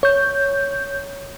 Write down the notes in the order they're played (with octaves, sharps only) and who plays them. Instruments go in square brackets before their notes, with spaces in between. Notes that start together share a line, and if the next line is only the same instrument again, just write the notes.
[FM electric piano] C#5 G6